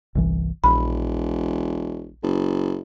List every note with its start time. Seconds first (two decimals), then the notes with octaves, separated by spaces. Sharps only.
0.15 G1 C2 E3
0.64 E1 A#1 B5
2.23 F#1